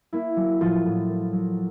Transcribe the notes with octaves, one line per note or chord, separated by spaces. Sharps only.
A#3 E4
F#3
A2 F3 F4
A2
A#3
F#3